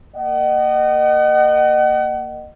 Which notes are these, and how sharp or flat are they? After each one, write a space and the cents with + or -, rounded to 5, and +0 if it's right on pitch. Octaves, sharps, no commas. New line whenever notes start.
A#3 -15 D#5 -30 F#5 +35